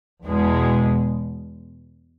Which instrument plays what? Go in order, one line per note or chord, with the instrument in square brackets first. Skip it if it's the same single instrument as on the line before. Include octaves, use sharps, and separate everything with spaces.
[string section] E2 B2 G#3